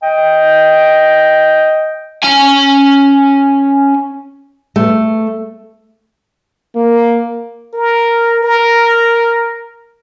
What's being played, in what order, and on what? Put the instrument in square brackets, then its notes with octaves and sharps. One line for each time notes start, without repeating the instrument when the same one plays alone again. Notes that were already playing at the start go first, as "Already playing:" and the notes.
[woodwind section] D#5 G5
[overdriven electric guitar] C#4 G#5
[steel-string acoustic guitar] A3
[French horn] A#3
[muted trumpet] A#4
A#4